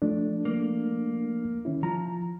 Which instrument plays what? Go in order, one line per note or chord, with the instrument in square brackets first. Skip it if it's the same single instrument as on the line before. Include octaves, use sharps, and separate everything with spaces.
[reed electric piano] F3 A3 D4
[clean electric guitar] A#3
[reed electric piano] D#3 C#4 E4
[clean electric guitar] F3 [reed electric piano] A#5